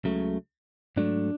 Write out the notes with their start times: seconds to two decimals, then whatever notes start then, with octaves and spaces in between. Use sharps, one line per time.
0.04 C#2 C#3 F#3 A3
0.96 G#2 F#3 A3 D4